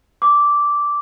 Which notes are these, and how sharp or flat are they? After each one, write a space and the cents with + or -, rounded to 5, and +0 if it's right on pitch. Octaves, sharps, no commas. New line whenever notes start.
D6 -10